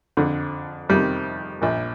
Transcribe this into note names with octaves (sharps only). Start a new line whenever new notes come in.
F2 D3
F2 C3 D#3 G3
A#1 A#2